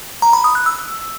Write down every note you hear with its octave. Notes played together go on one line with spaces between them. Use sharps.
A#5
B5
D#6
F#6
E6